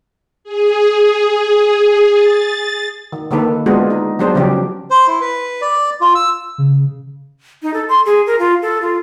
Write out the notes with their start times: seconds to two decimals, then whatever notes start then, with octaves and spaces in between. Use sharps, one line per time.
0.44 G#4
2.11 A6
3.12 D#3
3.31 D3 D#3 A#3 A4 B4
3.66 G#3 B3 D4 F4 F#4 G#4
3.90 D#4
4.19 F#3 B3 D4 G#4 C5
4.35 C#3 F3 F#3 C#4 G4
4.90 C5
5.07 E4
5.21 B4
5.61 D5
6.01 F4
6.15 E6
6.58 C#3
7.62 D#4
7.74 A4
7.89 C6
8.06 G#4
8.27 A#4
8.39 F4
8.62 A4
8.82 F4